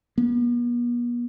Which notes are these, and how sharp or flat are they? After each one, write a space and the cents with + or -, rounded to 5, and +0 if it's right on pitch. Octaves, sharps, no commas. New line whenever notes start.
B3 -45